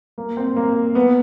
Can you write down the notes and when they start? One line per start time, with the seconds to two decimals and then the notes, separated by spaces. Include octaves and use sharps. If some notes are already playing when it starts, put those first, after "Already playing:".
0.18 A#3
0.37 C4
0.56 A#3
0.95 B3